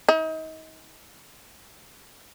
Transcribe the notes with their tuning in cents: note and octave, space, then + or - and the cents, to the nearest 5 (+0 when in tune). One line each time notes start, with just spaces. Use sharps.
D#4 +30